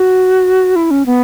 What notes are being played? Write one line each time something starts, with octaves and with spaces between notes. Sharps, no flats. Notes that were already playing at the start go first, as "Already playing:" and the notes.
Already playing: F#4
E4
C#4
B3